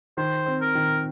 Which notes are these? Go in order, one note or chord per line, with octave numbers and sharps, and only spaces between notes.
D#3 C5
C4
A#4
D#3